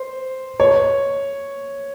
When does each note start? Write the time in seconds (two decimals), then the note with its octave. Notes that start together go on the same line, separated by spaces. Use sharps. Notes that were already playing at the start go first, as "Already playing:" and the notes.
Already playing: C5
0.60 C#5